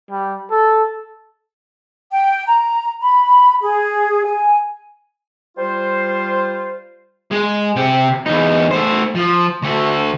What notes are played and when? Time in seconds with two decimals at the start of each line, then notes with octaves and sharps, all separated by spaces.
0.11 G3
0.51 A4
2.12 G5
2.47 A#5
3.01 B5
3.61 G#4
4.24 G#5
5.58 G3 F4 C5
7.31 G#3
7.76 C3 G5
8.26 E2 D#4
8.71 A3 C5
9.15 F3
9.62 D2 A3